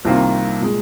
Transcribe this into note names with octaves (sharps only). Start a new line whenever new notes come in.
C2 C3 D#3 A#3 F4
A#2 G#3